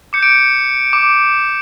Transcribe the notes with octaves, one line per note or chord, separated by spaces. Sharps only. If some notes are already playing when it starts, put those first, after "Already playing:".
D6 G6 C#7
D7
C#7
D6